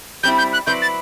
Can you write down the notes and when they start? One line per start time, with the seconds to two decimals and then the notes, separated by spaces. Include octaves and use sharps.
0.23 G3 C4 E4 G6
0.38 G6
0.53 F#6
0.67 F#3 C4 E4 B4 D5 G6
0.82 A6